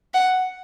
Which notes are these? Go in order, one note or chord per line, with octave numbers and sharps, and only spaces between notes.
F#5